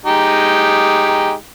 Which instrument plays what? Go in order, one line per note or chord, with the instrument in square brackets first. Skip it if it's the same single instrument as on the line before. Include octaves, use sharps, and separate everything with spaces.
[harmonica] G#3 D#4 G4